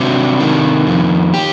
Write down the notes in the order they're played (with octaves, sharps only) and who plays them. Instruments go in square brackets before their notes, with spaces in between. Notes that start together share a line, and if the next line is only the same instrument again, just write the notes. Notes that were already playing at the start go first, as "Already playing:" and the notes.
Already playing: [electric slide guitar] C3 F#3 D4
D#3
F2
G4